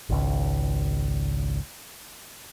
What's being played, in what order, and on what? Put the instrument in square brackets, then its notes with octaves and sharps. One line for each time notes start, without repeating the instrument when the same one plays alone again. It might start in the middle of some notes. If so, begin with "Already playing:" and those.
[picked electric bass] G#1 C#2